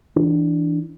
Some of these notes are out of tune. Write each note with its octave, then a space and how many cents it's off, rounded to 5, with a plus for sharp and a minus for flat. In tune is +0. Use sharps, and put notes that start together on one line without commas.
E3 +0 D4 +0